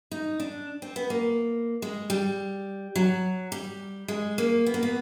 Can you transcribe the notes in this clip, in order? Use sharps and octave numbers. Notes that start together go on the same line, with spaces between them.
D#4
D4
C4
B3
A#3
G#3
G3
F#3
G3
G#3
A#3
B3
A#3
B3